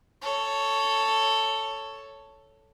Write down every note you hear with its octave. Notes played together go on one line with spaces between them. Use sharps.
A4 C#5